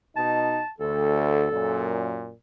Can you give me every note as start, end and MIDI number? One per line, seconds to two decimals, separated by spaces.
0.17 0.59 47
0.17 0.59 63
0.17 0.69 81
0.80 1.47 38
0.80 1.91 69
1.52 2.31 42
1.52 2.31 46